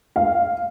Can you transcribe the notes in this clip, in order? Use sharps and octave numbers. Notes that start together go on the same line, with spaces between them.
F5